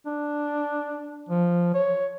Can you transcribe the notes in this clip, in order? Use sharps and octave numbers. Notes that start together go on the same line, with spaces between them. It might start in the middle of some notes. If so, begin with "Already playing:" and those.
D4
F3
C#5